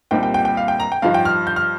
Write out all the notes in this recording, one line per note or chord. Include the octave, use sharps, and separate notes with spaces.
C2 A#2 G3 C4 D#4 G5
G5
G5
G5
F5
G5
A#5
G5
G2 F3 D#4 F5
G5
F6
G6
F6